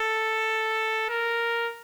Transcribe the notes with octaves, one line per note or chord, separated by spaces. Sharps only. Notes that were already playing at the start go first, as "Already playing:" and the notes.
Already playing: A4
A#4